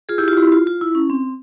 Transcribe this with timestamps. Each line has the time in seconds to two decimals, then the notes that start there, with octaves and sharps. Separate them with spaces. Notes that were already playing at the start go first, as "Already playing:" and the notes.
0.09 F4 G#4
0.18 E4 G4
0.28 F4
0.37 E4 G4
0.52 F4
0.67 F4
0.81 E4
0.95 C#4
1.10 C4